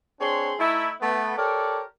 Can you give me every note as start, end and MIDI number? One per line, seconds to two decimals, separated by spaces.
0.20 0.53 60
0.20 0.53 62
0.20 0.53 68
0.20 0.53 73
0.20 0.53 84
0.59 0.90 57
0.59 0.90 63
0.59 0.90 64
1.01 1.35 57
1.01 1.35 59
1.37 1.82 67
1.37 1.82 69
1.37 1.82 70
1.37 1.82 73
1.37 1.82 74